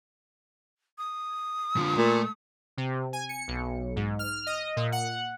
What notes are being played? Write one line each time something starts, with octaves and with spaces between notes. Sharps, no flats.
D#6
D3 F4
A#2 A3
C3
G#5
C#7
B1
G#2
F6
D#5
A#2
F#5